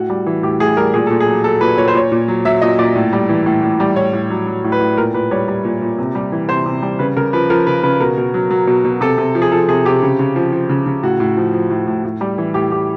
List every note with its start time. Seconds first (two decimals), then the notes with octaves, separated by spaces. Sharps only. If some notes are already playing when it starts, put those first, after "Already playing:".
Already playing: A2 F#4
0.10 G3
0.26 E3
0.43 A2 G4
0.60 A2 G#4
0.77 G3 A#4
0.94 A#2 G#4
1.07 A#2 A4
1.20 G#4
1.27 F#3
1.44 F#3 A4
1.61 A#2 B4
1.78 A#2 C#5
1.88 C5
1.94 A#2 C#5
2.12 A#2
2.28 F#3
2.45 F#3 E5
2.62 A#2 D#5
2.79 A#2 D5
2.96 A2
3.13 G3
3.29 E3
3.46 A2
3.63 A2
3.80 G3
3.96 A2 C#5
4.13 A2
4.30 F#3
4.47 F#3
4.64 A2
4.72 B4
4.81 A2
4.97 A#2 A#4
5.14 A#2 B4
5.31 G3 C#5
5.48 G3
5.65 A#2
5.81 A#2
5.98 C3
6.15 G3
6.32 E3
6.49 C3 C5
6.66 C3
6.82 G3
6.99 C#3 B4
7.17 C#3 A#4
7.33 F3 B4
7.50 F3 A#4
7.67 C#3 B4
7.83 C#3 B4
8.00 B2 A#4
8.17 B2
8.34 F#3
8.51 F#3
8.67 B2
8.85 B2
9.01 C3 A4
9.18 C3
9.35 F3
9.42 G#4
9.52 F3 A4
9.68 C3 G#4
9.85 C3 G4
10.03 C#3
10.19 C#3
10.36 F3
10.53 F3
10.69 C#3
10.86 C#3
11.03 A2 F#4
11.20 A2
11.37 F3
11.54 F3
11.70 A2
11.87 A2
12.04 A2
12.21 G3
12.38 E3
12.54 A2 G4
12.71 A2 G4